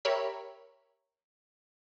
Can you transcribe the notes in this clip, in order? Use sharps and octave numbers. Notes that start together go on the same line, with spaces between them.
G4 A#4 C#5 E5 B5